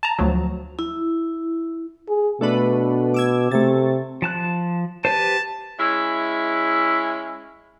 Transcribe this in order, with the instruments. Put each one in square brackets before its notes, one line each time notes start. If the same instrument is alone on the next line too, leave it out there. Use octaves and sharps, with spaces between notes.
[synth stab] A5 A#5
D2 F3 F#3
[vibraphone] E4
[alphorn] G#4
[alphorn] B2 [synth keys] A3 D4 B4
[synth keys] D6 E6 G#6
[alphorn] C3 [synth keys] A3 A6
[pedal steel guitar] F3 A5 F#6
[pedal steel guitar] G4 B4 C5 [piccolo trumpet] A5
[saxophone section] G#3 C#4 E4